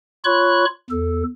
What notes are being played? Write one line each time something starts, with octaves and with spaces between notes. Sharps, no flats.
F4 C#5 B5 C#6 F#6
E2 A4